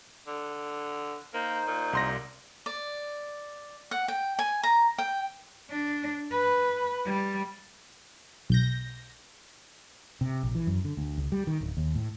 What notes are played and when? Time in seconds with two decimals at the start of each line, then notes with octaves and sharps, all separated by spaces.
0.27 D3
1.34 A#3 D#4 C5
1.68 A#2
1.93 C2 C6 A#6
2.66 D5
3.91 F#5
4.08 G5
4.39 G#5
4.63 A#5
4.98 G5
5.71 D4
6.31 B4
7.05 G3
8.50 B1 G6 A#6
10.21 C3
10.43 A#1
10.55 E3
10.67 F#2
10.84 D3
10.97 D2
11.17 C#2
11.32 G3
11.47 D#3
11.61 D1
11.77 D#2
11.95 A2